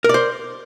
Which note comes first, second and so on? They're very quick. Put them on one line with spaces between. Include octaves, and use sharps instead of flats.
A#4 D5 C5